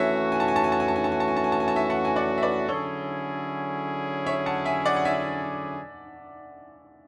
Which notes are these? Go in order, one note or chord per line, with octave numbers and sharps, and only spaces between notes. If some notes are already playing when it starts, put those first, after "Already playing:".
Already playing: E3 A3 C#4 F#4 C#5 E5
G#5
A5
G#5
A5
G#5
A5
G#5
A5
G#5
A5
G#5
A5
G#5
A5
G#5
A5
G#5
A5
E5 G#5
F#5 A5
G#5
D5 F#5
E5
B4 D5
D3 F#3 C#4 E4 G#4 A4 C#5
C#5 E5
F#5 A5
E5 G#5
D5 F#5
F#5
E5 G#5